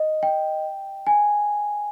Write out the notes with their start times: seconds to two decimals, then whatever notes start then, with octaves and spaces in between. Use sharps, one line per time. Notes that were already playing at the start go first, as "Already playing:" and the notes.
Already playing: D#5
0.23 G5
1.07 G#5